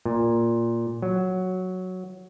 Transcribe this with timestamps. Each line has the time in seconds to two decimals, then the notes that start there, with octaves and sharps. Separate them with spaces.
0.05 A#2
1.02 F#3